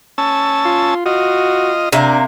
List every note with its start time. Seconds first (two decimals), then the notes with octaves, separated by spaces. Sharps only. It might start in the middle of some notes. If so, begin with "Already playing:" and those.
0.18 C#4 A5 E6
0.65 F4
1.06 F4 F#4 D#5
1.92 C3 A#3 D4